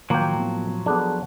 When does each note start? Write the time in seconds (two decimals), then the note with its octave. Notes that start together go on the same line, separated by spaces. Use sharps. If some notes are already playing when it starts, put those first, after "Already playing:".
0.10 A2 D#3 F3 F#3 A#3 G5
0.36 A2 B3
0.86 B3 D4 G#4 A4 F#6